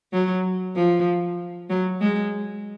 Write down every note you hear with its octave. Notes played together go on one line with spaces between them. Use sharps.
F#3
F3
F#3
G#3